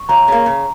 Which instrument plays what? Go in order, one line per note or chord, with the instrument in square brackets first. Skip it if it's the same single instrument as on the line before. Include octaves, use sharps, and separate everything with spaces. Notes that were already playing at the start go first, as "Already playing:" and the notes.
Already playing: [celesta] C#6
[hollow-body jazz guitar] C#2 [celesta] A#5
[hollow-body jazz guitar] C#3 A#3
C#3